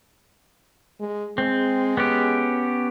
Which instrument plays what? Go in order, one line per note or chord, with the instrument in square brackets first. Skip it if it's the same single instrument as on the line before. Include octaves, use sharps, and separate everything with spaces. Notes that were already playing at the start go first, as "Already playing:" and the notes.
[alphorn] G#3
[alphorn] G#3 [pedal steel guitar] C4
[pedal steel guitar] B3 C#4 G4